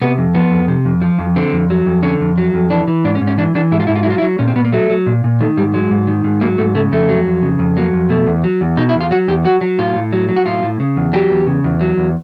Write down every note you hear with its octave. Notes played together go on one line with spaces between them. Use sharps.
C3 B3
F2
F3 B3
F2
C3
F2
F3
F2
D3 C4
F2
F#3
F2
D3 C#4
F2
F#3
F2
E3 D4
E3
G#2 D4
C#4
G#2
C#4
E3 D4
E3 D4
G#2 E4
F4
G#2 E4
F4
E4
F#3 F4
E4
F#3
A#2 C#4
C4
A#2 B3
A#3
F#3 A3
F#3
A#2
A#2
D#3 A3
G#2 G3
F#3 G#3
G#2
D#3
G#2
F#3 A#3
G#2 A3
C#3 A3
F2 A3
F#3
F2
C#3
F2
F#3 A#3
F2
B2 A3
E2
F#3
E2
B2 D#4
E4
E2
F4
F#3 F#4
E2 G4
F#3 F#4
F#3
A2 F4
A2
F#3
F#3
F#4
A2 F4
A2
C#3
E2
F#3 G4
E2
C#3
E2
F#3
E2